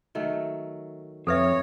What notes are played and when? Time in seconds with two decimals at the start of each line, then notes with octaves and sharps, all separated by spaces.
0.15 D#3 F#3 A3
1.27 F2 A4 B4 C#5 E5